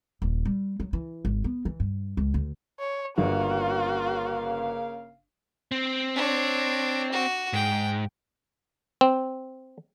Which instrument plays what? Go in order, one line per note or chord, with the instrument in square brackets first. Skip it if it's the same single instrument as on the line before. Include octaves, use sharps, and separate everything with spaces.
[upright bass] D#1
G3
F#3
E3
G#1
B3
E3
G2
C#2
D2
[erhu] C#5
[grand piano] G1 [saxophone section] C#3 F5 [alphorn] A#3 [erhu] F#4
[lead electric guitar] C4
[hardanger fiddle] D4 C#5
F#4
[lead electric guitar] G#2 [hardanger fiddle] G5
[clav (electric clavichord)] C4